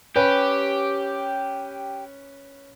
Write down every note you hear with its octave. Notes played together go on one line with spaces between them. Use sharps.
C#4 G4 B4